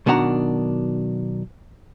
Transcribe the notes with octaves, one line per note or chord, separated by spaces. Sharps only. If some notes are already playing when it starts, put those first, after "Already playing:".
B1 B2 D#3 D4 F#5 A#5